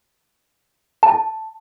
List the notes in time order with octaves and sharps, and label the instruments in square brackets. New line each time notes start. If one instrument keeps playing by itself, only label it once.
[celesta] A5